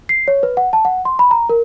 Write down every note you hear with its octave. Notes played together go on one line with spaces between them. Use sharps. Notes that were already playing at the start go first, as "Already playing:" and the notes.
C7
C#5
B4
F#5
A5
F#5
C6
B5
A#5
A#4